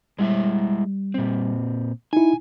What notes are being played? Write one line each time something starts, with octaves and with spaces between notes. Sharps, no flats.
G3 G#3 E4 E5
A#2 C4
D#4 E4 G#5